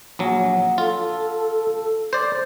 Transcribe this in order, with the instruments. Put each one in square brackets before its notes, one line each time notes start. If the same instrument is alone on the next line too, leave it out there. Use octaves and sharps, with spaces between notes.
[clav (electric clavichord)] A#1 F#3 [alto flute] F#5
[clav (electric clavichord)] F4 [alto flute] A4
[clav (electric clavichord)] C5 D5